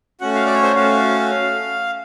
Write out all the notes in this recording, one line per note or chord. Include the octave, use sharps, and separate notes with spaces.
A3 C#4 F#4 F#5
F5
D5
C#5
C5
A3 C#4 F#4 F5